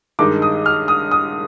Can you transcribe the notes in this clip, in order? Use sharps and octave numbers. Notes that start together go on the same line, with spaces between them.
G2 D#3 G#3 D#4 D6
D#6
F6
D#6
D#6